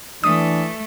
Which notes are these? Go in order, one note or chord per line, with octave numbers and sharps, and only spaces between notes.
E3 A3 D4 D#6